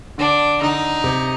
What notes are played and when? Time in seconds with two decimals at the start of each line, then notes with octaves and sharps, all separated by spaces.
0.18 D3 D4
0.62 D3 D#4
1.04 C3